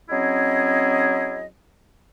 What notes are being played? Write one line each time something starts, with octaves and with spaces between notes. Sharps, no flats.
F#3 C4 C#4 E4 G#4 D#5